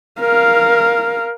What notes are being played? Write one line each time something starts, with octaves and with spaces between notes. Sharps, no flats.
A#4 F5